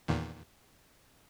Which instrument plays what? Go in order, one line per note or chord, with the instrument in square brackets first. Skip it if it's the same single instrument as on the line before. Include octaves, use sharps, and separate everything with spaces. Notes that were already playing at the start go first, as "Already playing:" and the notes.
[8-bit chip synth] E2 A#2 D#3